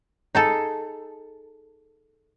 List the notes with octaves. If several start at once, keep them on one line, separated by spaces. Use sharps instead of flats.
D#4 G#4 A4